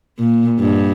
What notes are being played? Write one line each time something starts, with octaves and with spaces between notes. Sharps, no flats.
A#2
G2